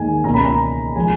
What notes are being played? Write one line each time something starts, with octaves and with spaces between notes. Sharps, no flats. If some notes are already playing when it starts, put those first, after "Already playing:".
Already playing: D#2 D#3 G#3 G#5
C#2 B2 A#3 A#5
B5
A#5
F3 G#3 G#5